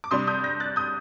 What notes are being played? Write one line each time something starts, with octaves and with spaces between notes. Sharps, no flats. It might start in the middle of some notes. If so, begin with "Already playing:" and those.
D6
C3 G3 D4 C6 D#6
D#6 G6
G6 A#6
F#6 A6
D#6 G6